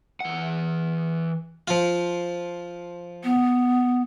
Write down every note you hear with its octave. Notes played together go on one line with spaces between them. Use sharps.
E3 F#5
F3 F4
B3